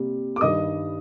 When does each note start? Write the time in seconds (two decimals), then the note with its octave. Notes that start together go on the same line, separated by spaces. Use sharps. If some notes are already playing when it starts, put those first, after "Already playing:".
Already playing: C3 G3 A#3
0.36 D6
0.41 G2 D#3 G3 D#5 D#6